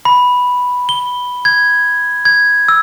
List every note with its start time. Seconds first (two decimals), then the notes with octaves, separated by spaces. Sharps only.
0.05 B5
0.89 G7
1.45 G#6
2.25 G#6
2.68 E6